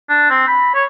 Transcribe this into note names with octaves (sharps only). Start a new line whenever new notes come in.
D4
C4
B5
C#5